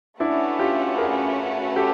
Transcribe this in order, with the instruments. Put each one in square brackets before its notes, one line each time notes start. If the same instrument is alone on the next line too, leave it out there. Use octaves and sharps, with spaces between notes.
[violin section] A3 C#4 F#4 B4 [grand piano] D4 E4
[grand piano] F4 G4
G#4 A#4
G4 A4